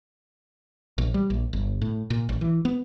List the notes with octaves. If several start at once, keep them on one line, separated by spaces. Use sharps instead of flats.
A#1
G3
A#1
G1
A2
A#2
A1
E3
B3